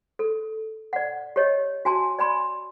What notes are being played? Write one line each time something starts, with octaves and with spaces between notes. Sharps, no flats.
A4
D5 F#5
G4 C#5 D#5
F#4 G#5 A5 C6
D5 G#5 B5 C6